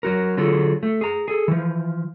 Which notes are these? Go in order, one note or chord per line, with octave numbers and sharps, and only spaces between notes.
F#3 F#4 A#4
D3 F#3 F4 G#4 A4
A3
G#4 A#5
G#4 A4
E3 F3